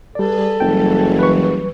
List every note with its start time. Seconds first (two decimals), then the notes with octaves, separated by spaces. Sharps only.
0.15 G3 G#4 A4 B4 D5
0.60 F#1 E3 F#3 G3 G5
1.19 B4 C#6